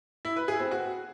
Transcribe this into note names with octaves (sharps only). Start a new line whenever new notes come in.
E4
B4
G#4
C4
F#4